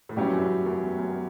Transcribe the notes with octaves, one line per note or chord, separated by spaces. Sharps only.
A2
G2 F#3 C#4 E4 G4
F#2
F#2
E2
F#2